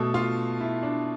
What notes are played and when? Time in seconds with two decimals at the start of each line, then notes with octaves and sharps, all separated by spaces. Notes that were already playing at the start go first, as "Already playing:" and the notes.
Already playing: B2 A3 A4
0.14 F4
0.60 E4
0.83 D4